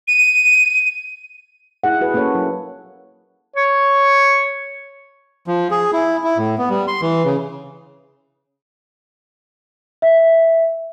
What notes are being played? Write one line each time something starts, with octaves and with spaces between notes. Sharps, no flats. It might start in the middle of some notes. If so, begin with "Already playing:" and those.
D#7
E4 G#4 F#5
F#4 G#4 B4
A#3 C#4 G#4 A4 C#5
F#3 E4
C#5
F3
G#4
E4
E4
A2
B3
G3
C6
E3
C#3
E5